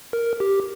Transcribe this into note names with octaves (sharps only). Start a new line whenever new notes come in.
A#4
G4